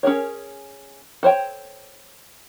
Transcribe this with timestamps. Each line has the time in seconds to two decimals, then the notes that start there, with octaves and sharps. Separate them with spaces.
0.03 C#4 G#4 A#4 C#5
1.23 A4 C5 C#5 G5